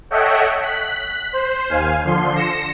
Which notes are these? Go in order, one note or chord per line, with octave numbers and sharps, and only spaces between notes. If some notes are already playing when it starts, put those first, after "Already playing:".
A4 C#5 D#5 E5 F#5 G5
F#6 B6
C5
D#2 F5 G#5
D3 F3 C6
A#6 C#7 E7